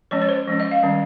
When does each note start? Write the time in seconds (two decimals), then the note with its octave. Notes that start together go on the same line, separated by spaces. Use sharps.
0.11 F3 G#3 C#4 C#5
0.22 C#5
0.29 C5
0.48 F3 G#3 C#4
0.60 D#5
0.71 F5
0.83 D#3 G3 C#4